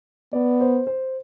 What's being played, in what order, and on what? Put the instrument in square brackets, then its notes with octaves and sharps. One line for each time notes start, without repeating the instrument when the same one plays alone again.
[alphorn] B3 [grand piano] D5
[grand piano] C5
C5